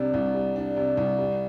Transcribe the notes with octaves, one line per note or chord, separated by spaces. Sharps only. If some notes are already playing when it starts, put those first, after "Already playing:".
Already playing: C2 C3 G3 D4
C2
G3
D4
C3
C2
G3